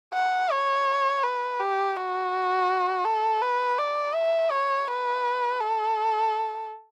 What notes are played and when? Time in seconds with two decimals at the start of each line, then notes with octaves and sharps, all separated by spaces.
0.14 F#5
0.51 C#5
1.23 B4
1.60 G4
1.96 F#4
3.05 A4
3.42 B4
3.78 D5
4.15 E5
4.51 C#5
4.87 B4
5.60 A4